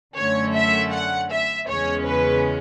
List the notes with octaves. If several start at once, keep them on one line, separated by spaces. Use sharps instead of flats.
F#2 D3 A3 C#4 C#5
E5
F#5
E5
E2 C#3 G#3 C#4 C#5
B4